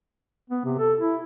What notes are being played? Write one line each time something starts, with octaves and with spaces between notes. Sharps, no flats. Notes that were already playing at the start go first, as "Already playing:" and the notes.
B3
C3
A4
E4